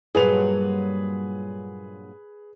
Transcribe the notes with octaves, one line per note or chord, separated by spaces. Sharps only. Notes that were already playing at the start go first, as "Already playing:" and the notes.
G2 A#2 F#3 G#4 B4 F7